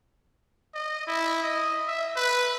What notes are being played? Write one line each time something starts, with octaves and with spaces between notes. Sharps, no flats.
D#5
E4
D#5
E5
B4